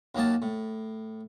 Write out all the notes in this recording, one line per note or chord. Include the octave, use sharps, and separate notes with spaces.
D#2 F#3 A#3 D#5 A5
A2